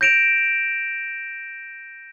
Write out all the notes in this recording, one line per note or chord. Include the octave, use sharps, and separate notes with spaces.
G6 A#6 D7 E7 F7